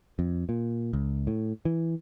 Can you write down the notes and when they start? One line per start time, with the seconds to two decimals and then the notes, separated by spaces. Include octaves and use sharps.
0.19 F2
0.49 A#2
0.93 C#2
1.27 A2
1.65 E3